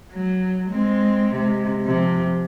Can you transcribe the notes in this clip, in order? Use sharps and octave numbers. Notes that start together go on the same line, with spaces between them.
F#3
G#3 C4
C3 G#3
C3 F3